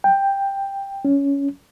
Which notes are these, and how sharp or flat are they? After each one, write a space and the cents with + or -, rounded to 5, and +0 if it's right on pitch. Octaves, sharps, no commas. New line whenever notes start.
G5 +10
C#4 +15